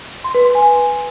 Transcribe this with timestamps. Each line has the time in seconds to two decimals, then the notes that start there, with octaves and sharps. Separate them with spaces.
0.24 C6
0.35 B4
0.45 C6
0.55 G#5